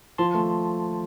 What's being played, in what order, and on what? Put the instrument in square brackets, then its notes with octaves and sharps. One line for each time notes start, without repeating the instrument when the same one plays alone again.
[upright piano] F3 [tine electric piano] A5 C6
[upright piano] A3